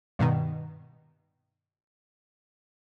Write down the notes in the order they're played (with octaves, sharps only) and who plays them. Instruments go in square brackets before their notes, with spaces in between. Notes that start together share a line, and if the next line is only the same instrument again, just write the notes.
[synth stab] G2 B2 D#3